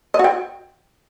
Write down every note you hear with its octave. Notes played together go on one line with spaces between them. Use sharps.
D#5
F#4
G5